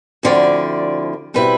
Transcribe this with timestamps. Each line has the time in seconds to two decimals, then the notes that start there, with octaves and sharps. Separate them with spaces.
0.23 D2 D3 F3 C4 E4 D5
1.34 B2 G3 C4 E4 B4